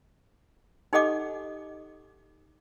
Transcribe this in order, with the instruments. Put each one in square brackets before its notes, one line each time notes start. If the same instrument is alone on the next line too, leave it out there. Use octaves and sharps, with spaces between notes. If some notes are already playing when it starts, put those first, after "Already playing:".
[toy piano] D#4 G4 A4 D#5 F#5 D6